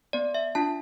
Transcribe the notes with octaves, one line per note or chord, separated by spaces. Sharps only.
B3 D5
E5
D4 F4 A5